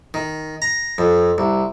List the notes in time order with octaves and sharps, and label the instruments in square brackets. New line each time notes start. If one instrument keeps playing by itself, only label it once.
[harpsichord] D#3
A#5
F2
C2